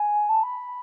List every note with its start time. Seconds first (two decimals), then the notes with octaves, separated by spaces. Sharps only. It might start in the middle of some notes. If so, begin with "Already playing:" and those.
Already playing: G#5
0.29 A5
0.43 B5